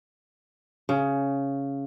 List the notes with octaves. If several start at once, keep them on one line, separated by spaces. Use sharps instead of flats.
C#3